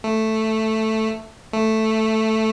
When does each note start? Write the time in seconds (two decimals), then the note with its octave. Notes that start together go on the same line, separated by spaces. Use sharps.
0.04 A3
1.53 A3